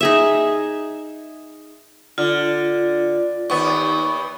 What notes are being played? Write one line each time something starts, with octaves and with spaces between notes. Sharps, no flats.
D#4 G#4 E5
D3 F4
D#2 B3 C#6